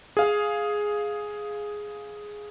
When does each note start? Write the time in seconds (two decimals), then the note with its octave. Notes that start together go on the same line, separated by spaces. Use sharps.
0.17 G#4 F5